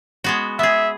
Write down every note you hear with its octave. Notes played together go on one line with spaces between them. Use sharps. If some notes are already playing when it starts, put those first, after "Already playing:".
G#3 B3 F#4
B3 G#4 E5